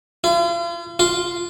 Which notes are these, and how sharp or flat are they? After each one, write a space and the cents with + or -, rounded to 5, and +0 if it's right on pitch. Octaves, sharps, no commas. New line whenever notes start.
F4 -40
F4 -5